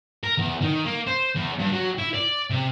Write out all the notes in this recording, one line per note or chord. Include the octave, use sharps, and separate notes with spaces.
A#4
E2
D#3
A#3
C5
E2
G2
F#3
E4
D5
C3